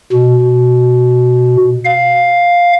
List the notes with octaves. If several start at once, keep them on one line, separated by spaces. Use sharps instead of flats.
B2
F5